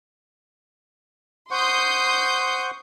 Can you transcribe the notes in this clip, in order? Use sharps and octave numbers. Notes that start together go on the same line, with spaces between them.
C5 F#5 C6 C#6 D#6 G6